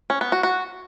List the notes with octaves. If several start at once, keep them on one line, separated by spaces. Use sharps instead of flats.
C#4
B3
F#4
F#4